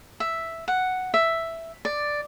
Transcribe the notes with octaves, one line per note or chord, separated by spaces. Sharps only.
E5
F#5
E5
D5